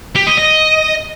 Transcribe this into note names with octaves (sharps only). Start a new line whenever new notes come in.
G4
D#5
D#5